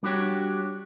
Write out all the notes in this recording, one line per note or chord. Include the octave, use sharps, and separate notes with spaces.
G3 D4 F#4 G4 C#5